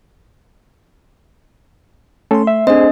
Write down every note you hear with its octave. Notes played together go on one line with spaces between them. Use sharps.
A3 C#4 A4 C6
E5
C4 D4 G#4 A4 C5 D#5